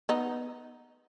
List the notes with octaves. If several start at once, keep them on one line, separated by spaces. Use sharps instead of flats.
B3 D#4